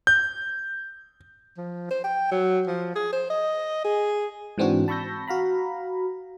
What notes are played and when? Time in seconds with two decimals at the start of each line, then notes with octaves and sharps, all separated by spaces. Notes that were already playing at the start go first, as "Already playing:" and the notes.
0.07 G6
1.57 F3
1.91 C5
2.04 G5
2.31 F#3
2.67 F3
2.96 G#4
3.12 C5
3.30 D#5
3.84 G#4
4.58 G#2 E3 C4 D4 F#4
4.88 A5 B5 C#6 E6 G6 A#6
5.27 F#4 F5 A#5 B5